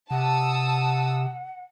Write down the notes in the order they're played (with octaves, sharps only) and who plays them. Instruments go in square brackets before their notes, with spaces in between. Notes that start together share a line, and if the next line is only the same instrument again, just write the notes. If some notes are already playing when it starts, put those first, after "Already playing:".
[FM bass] C3 [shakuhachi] F#5 [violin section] A5 D#6 E6